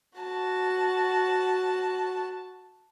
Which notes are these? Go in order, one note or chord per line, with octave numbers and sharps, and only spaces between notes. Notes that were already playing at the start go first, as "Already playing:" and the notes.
F#4 A5